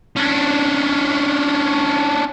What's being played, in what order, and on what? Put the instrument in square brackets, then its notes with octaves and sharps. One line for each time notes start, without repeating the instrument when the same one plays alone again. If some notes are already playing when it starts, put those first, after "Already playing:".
[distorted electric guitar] C#4 D4